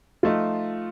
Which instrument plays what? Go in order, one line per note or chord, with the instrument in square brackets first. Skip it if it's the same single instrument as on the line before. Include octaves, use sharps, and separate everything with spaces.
[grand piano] F3 A3 D#4 [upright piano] F4